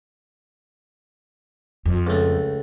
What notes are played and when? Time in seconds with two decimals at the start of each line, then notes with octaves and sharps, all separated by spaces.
1.86 F2
2.07 C#2 A3